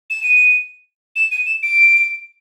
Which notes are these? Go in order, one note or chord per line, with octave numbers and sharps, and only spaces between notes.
E7
D#7
E7
D#7
E7
D7